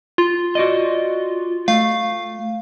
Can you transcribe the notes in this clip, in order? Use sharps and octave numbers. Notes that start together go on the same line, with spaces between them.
F4
F#4 D5 D#5
A3 F5